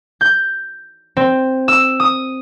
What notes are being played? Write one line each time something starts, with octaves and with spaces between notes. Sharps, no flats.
G6
C4
E6
D#6